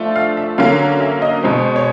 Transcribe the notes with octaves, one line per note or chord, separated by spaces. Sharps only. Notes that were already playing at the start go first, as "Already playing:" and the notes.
Already playing: F3 A3 D4 F4
F5
E5
D3 F#3 A#3 C#4 F5
E5
D#5
B2 G#3 C4
C#5